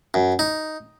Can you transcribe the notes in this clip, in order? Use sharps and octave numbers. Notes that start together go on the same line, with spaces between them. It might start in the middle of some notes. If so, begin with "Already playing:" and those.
F#2
D#4